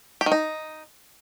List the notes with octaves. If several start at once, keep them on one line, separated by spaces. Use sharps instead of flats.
G4
D#3
D#4